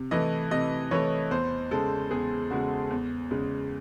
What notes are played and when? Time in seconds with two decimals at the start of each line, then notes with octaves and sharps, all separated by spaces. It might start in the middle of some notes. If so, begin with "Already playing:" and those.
Already playing: C3
0.11 E3 A3 D#5
0.51 C3 D#5
0.91 E3 A3 C#5
1.31 E2 C5
1.71 C#3 G#3 A4
2.11 E2 G#4
2.51 C#3 G#3 F#4
2.90 E2
3.31 C#3 G#3